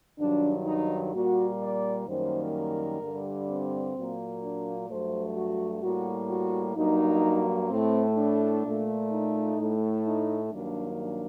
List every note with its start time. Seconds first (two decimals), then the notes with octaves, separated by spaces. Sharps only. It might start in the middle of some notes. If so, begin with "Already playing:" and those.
0.19 G2 D#3 F#3 D4
0.66 D#4
1.13 A#2 G3 A#3 F#4
1.60 D5
2.07 F#2 D#3 G3 A#3 C5
2.54 A#4
3.01 G2 D3 G3
3.48 C4
3.95 A#2 F#3 A#3
4.42 D4
4.88 G2 F#3 A3 C5
5.35 F#4
5.82 A2 G3 A#3 F#4
6.29 F#4
6.76 G2 F#3 A#3 D#4
7.70 A2 A3 C4
8.17 D4
8.64 A#2 A3
9.11 D#4
9.58 A2 A3
10.05 D#4
10.51 G2 D#3 F#3 A#3 D4
10.98 D4